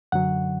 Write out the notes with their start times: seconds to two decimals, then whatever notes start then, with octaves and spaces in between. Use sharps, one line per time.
0.12 F#2 D3 F#3 F#5